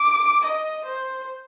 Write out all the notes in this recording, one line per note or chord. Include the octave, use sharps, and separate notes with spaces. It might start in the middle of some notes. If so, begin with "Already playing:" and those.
Already playing: D6
D#5
C5